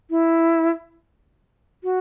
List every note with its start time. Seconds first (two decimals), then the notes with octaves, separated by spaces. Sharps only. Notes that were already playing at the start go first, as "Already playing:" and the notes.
0.10 E4
1.84 F#4